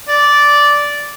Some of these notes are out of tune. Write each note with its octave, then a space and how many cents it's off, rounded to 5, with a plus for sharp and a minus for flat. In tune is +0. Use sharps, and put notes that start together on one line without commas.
D5 -10